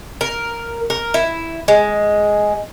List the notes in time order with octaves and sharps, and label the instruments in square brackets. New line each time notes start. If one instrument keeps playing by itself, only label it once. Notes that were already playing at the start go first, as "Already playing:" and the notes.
[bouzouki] A#4
A#4
E4
G#3